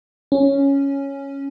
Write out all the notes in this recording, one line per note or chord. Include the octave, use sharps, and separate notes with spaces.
C#4